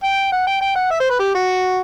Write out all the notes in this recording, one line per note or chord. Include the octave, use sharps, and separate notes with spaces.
G5
F#5
G5
G5
F#5
E5
C5
B4
G4
F#4